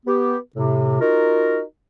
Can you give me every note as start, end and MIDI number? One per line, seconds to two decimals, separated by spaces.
0.06 0.36 59
0.06 0.36 67
0.56 0.98 45
0.56 0.98 48
0.99 1.60 63
0.99 1.60 65
0.99 1.60 66
0.99 1.60 70